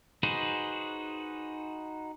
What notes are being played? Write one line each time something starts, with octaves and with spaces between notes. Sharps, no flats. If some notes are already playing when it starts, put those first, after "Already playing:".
D#4 F#4 G#4 B4 C5